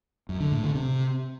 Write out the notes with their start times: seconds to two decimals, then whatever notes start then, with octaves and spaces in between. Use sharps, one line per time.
0.29 F#2
0.40 D3
0.52 A2
0.63 D3
0.75 C3